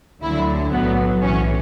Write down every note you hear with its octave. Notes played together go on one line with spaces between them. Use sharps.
D2 D3 F#3 E4
B1 A2 F#3 B3
B1 A2 E3 C#4